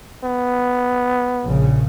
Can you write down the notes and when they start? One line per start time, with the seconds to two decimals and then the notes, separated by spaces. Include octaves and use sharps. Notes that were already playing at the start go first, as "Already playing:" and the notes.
0.24 B3
1.45 A#1 C#3